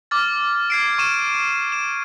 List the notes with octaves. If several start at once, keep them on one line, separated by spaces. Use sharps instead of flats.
D6 F6 A6
G#6 C7 D7
C#6 D#7 E7
E7